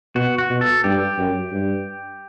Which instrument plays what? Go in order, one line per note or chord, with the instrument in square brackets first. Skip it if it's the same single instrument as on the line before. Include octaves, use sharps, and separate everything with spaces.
[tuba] B2 [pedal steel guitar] F#4
[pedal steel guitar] F#4
[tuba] B2
[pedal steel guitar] A4
[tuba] G2 [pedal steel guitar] G4
[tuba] F#2
G2